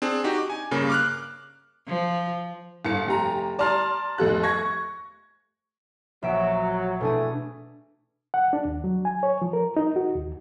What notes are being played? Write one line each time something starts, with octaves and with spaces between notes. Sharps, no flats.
C4 D4 G#4
D#4 F#4 G4
D6
G#5
G2 C#3 A#3
D6 F6 F#6
F3
G1 C#7
F1 G4 A#5
D5 A5 A#5 C6 F6
F1 F2 A4 F#6
C#6 G#6 A#6
A#1 F#3 E5 D7
B2 E3 A3 D4 G#4
F#5
D4
D#2
F#3
G#5
C#5
F3
A#4
D#4
F#4
D#2